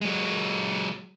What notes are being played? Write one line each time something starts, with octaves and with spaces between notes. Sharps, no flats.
F#3 G#3